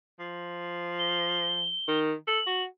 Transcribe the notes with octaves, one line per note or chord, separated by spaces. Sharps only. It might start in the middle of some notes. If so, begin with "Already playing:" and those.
F3
G7
D#3
A4 F#7
F#4